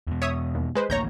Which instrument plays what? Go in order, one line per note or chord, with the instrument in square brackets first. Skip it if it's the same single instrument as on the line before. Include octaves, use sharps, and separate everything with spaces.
[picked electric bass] E2 B2
[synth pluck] C#5 E5 D#6
D#2
G#3 B4 C5
[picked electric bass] A1 D2 A#3 [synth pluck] C#5 A#5 G6